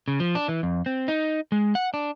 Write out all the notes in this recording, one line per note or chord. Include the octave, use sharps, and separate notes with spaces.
C#3
F3
D4
E3
F2
C4
D#4
G#3
F#5
D4